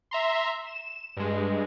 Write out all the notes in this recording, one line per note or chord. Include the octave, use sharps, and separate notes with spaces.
E5 A#5 C6
E7
G2 G#3